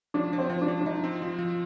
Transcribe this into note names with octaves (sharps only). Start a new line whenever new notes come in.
F3 D4
F3
C4
F3
D4
F3
D4
F3 D#4
C4
F3 F4
F3